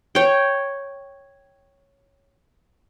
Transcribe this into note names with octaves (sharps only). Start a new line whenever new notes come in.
C#5 G5